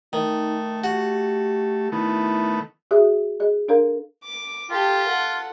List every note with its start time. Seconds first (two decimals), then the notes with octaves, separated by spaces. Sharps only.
0.13 D#3 A3 D#4
0.84 F#4 G4
1.92 D#3 A3 B3 E4
2.91 F#4 G#4 E5 D#6
3.40 G#4 D#5
3.69 D4 A4 A#4 F5 A#5
4.25 D6
4.71 F4 G4 A4
5.09 A4 F#5